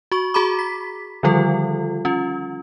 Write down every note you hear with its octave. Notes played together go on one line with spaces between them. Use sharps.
F#4 C#6
F#4 G#4 A#5 B5 D6
B6
D3 D#3 F3 G3 F4 A4
C#4 F4